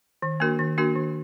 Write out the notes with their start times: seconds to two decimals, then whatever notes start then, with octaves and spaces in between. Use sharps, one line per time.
0.22 D#3
0.40 A#3 D4 F#4 A#4
0.59 D#3
0.78 A#3 D4 F#4 A#4
0.96 D#3